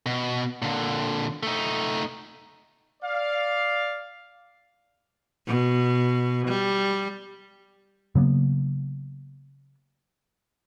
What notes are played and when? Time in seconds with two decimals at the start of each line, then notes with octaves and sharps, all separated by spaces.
0.06 B2
0.62 A#2 D3
1.43 A3 D#4
3.03 D5 F5
5.47 B2
6.48 G3
8.15 C#3 F#3 A#3 B3